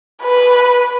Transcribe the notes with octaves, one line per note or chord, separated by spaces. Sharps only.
B4